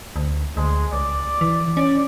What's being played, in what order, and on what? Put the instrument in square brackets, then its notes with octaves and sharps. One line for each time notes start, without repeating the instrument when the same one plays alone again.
[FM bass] D2
[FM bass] D2 [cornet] G#3
[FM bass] C#2 [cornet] D5
[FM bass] E3
[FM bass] C#4 [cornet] D5